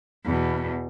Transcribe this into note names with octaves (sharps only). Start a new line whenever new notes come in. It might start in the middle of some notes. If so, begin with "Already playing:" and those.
E2 B2